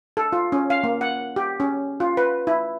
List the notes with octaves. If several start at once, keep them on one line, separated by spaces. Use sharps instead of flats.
A4
F4
C#4
F5
A#3
F#5
G4
C#4
F4
B4
E4